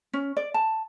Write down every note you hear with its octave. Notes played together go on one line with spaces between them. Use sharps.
C#4
D5
A5